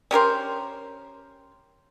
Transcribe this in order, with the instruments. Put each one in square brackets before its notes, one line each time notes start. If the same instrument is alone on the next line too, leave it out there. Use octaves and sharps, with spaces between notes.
[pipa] C#4 G4 A#4 C5